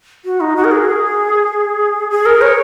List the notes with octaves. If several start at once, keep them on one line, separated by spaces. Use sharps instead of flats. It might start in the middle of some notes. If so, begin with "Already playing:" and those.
F#4
D#4
F#4
A#4
G#4
G#4
A#4
C#5